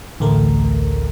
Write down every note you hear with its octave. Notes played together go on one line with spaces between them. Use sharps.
A1 D2 A3 A#4